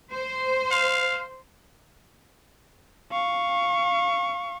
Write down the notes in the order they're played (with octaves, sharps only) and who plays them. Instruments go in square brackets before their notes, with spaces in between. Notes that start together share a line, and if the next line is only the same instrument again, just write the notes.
[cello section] C5
[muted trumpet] F5
[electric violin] F5 C#6